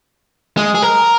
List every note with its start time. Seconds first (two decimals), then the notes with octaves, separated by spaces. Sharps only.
0.57 G#3
0.75 G#4
0.82 A#4